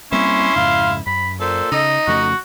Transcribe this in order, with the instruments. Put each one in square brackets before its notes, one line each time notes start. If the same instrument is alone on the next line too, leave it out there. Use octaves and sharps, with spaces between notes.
[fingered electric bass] G3 A#3 C4 [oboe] C#4 [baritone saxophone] E4 [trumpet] C6
[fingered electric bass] F2 G#2 C#3 [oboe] F5
[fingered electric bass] F#2 [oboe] B5
[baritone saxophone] A#2 [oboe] A4 [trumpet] C5
[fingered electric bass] C#3 [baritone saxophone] D#4 [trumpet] D#5
[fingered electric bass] F2 C#3 A3 [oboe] F#4